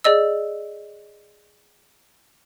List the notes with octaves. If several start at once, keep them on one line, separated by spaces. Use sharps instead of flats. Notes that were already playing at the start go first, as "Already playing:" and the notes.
G#4 D5 D#5 E6